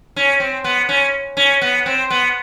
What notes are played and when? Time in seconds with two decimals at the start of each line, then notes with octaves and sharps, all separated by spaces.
0.16 C#4
0.40 C4
0.64 B3
0.89 C#4
1.37 C#4
1.62 B3
1.86 C4
2.10 B3